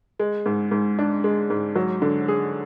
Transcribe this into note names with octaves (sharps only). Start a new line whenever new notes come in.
G#3
G#2
G#2
D4
G#3
G#2
F#3
D3
G#4